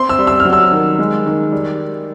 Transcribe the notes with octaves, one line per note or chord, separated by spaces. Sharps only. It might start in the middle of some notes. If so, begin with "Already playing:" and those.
Already playing: C4 C6
E6
G3
E6
F6
F#3
E6
D#3
G#3
D#3
G3